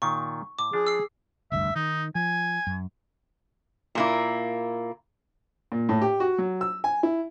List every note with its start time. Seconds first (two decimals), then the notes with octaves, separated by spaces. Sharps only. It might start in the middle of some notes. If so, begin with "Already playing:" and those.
0.02 A#2 D#3 C#6
0.59 A2 D6
0.73 F3 D4 G#4
0.87 E6 C7
1.52 F1 D2 G2 E5
1.75 D#3 D#4
2.15 F3 G#5
2.67 F#2
3.95 A#2 A#3 E4
5.72 A#2
5.89 A2
6.02 G4
6.20 F#4
6.38 F#3
6.61 E6
6.84 G#5
7.03 E4